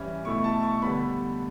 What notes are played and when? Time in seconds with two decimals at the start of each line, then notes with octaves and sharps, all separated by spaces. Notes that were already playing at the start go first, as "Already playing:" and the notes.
Already playing: E3 G3 C#4 E4
0.25 B2 A3 E4 C#6
0.44 A5
0.63 C#6
0.82 D3 G3 B3 B5